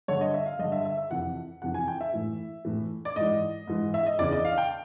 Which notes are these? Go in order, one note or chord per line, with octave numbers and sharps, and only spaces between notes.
G2 D3 C#5
D#5
E5
F5
G2 D3 D#5
E5
E5
E5
F2 C3 E3 F#5
F2 C3 E3 F#5
G#5
G5
E5
A2 E3
A2 E3
D5
G#2 E3 D#5
G#2 E3
E5
D#5
E2 C#3 E3 D5
D#5
F5
G5